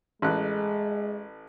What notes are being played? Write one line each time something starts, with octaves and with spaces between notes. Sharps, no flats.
A1 G#3 F#6